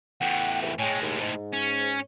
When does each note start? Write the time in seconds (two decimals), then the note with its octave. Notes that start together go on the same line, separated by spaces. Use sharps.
0.21 E2 A2 F#5 G5
0.62 C2 G#2 E3
0.79 A2 G#3 C#5 G5 G#5
1.02 D#2
1.20 G#2
1.53 C#4